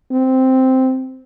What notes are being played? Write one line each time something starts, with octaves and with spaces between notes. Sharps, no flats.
C4